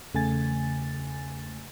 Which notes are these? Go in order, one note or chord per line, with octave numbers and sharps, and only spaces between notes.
E2 C#3 A3 G#5 A6